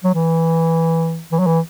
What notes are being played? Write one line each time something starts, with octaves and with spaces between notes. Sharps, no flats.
F#3
E3
E3
F#3
E3